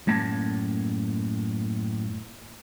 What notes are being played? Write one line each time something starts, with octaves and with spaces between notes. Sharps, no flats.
F#2 A2 A#3 A5